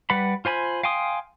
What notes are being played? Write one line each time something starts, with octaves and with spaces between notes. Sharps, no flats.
G3 B4 F#5 B5
F4 C5 G#5 B5
F5 G5 G#5 C6 D#6